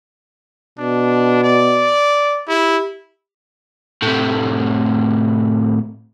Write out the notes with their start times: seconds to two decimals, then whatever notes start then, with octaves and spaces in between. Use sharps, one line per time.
0.79 B2 D4
1.44 D5
2.48 E4 G4
4.02 A2 C3